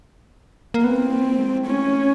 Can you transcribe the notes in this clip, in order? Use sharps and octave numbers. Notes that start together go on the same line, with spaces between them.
A#3
B3 C4
A#3
B3
A#3
G#3
A3 C#4